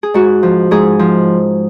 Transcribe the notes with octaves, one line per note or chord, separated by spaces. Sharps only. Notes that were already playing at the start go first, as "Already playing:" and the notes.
G#4
G#2 F#4
F3
G#2 G#4
F3